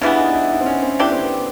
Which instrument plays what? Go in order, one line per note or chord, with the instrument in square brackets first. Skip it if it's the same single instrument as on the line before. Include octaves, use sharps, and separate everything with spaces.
[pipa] C#3 E3 G3 B3 [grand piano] D4
[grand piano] D#4
E4
D#4
C4
C#4
C4
[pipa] E3 A3 D4 G4 [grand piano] B3
[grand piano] C4
B3